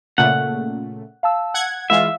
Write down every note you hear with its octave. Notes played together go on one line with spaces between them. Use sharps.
A#2 C#3 A3 F#5
F5 A5 E6
F#5 G#6
E3 G#3 F4 E5 F5